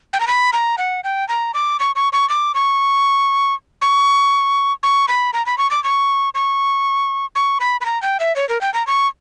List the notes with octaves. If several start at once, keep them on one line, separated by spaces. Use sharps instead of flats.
G5
A#5
B5
A#5
F#5
G5
A#5
D6
C#6
C#6
C#6
D6
C#6
C#6
C#6
B5
A#5
B5
C#6
D6
C#6
C#6
C#6
B5
B5
A#5
G5
E5
C#5
A#4
G5
A#5
C#6